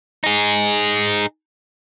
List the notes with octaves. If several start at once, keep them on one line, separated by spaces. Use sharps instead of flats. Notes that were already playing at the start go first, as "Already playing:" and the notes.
D#4 G#4